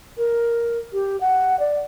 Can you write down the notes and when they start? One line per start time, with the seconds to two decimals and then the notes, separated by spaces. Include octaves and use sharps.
0.17 A#4
0.93 G4
1.20 F#5
1.59 D5